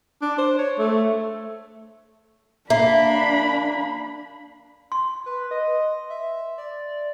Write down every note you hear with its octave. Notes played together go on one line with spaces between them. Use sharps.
D4
C5
C#5
A3
A#3 D4 E5 B5
C6
B4
D#5
E5
D5